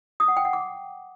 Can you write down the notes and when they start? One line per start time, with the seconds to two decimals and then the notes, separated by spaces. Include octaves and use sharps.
0.20 D#6
0.28 F#5
0.37 G5
0.45 F#5
0.53 D6